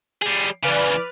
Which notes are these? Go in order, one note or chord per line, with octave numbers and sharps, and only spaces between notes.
G3 G#4
C#3 E3 B4 D5 F6